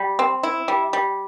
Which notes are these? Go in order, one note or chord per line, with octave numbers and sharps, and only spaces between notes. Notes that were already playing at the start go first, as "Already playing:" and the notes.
Already playing: G3
C4
E4
G3
G3